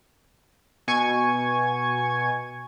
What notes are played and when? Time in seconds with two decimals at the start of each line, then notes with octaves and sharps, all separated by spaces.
0.88 B2 G#5 C#6 G#6